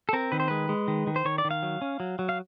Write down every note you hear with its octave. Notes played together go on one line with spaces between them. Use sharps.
A4
C4 A#4
D#3 B4
C5
G#3 B4
G#3
D#3
D#3
C5
D#3 C#5
D5
D#3
F5
F#3
C#4
F#3
F#3
F5